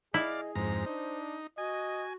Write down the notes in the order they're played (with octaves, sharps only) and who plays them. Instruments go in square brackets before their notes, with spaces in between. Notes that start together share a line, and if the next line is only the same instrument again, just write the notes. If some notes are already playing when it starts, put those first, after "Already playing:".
[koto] E4 [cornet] G#4 [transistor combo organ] D5 F5 [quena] D#5
[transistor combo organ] F2 G#2 A#5 [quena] C5
[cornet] D4 [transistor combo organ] D#4
[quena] F#4 [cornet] D#5 [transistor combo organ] G#5